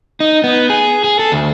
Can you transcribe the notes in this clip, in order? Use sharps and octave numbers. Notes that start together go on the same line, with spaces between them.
D#4
B3
G#4
G#4
A4
D2